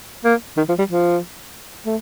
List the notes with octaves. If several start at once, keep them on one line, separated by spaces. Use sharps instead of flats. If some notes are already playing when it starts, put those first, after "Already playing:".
A#3
D#3
F3
G3
F3
A3